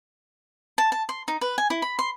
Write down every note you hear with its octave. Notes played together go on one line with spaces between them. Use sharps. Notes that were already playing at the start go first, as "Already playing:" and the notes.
A5
A5
C6
D#4
B4
G#5
E4
B5
C6